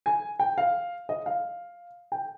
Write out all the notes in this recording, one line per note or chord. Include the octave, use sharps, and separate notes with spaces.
G#5
G5
F5
D#5
F5
G5